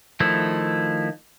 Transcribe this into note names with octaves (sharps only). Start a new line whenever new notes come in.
D#3 F3 A3 E4